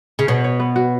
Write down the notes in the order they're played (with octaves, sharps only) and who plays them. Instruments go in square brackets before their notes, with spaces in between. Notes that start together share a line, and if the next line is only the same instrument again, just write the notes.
[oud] C#3
[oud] B2 [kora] C#5
[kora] C#5
B3
F#4